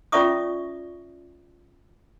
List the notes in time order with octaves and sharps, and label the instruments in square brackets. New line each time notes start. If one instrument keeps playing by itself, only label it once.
[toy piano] C#4 F4 D5 E5 C#6 D#6